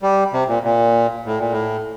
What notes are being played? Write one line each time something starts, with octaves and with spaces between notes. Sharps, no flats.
G3
C3
A#2
A#2
A2
A#2
A2